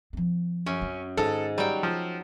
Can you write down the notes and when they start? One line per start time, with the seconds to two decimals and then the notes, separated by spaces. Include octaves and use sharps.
0.13 F3 C4
0.66 F#2 C#4
0.82 C4
1.17 G#2 D#3 A4
1.58 F#3 G3 G5
1.83 F3